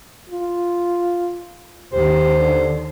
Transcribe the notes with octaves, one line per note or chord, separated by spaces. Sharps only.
F4
D#2 D#3 G4 C5
D3